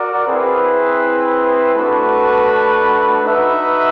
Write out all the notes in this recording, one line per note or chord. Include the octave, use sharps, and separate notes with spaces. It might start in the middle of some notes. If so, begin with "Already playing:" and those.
Already playing: F#4 A#4 D5
C4 E4 G#4 B4
A3 D4 F#4 B4
D#4 F#4 B4 E5